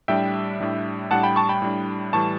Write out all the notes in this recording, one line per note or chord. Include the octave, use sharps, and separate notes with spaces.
A2 G3 D4 E5 G5
A2 G3 D4
A2 G3 D4 F#5 A5
G5 B5
A5 C#6
G5 B5
A2 G3 D4
A2 E3 G3 A5 C#6